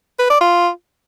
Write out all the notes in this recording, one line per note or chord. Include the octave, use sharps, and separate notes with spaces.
B4
D5
F4